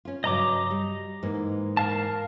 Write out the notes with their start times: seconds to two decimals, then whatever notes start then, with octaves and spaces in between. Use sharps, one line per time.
0.05 C#4 F4
0.24 G2 C#3 F#3 D#5 A#5 D6
0.71 G3
1.23 G#2 E3 A#3
1.77 A#4 F5 A5